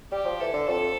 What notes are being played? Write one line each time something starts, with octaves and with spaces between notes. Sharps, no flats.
G3 G4
F3
E3 A4
D3
F2 A4